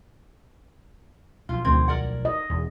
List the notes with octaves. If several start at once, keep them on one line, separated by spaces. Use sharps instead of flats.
B1 F3 F4
D2 D#3 C4 G#6
A#4 D5 F#5
D#5
E1 E2